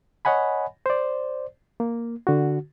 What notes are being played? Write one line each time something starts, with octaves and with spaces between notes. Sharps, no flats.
C#5 D#5 F#5 G#5 B5
C5 D5
A#3
D3 F#4